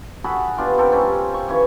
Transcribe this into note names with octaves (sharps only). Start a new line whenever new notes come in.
F#4 G#4 A4 B5
B3 D4 F4 G4
C4 G4 A4 A#4
G3 C4 C#4
C#6
C#3 E3 C#5